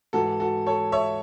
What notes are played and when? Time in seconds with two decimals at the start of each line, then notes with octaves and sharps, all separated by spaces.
0.13 G#2 E3 F#4 A4
0.40 F#4 A4
0.66 A4 C#5
0.92 C#5 E5